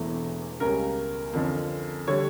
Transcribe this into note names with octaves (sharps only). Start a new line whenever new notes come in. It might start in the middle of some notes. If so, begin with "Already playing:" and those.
Already playing: E1 E2 E3 A3
C#2 C#3 G3 C#4 A#4
F2 D3 F3 C#4
D3 G3 C#5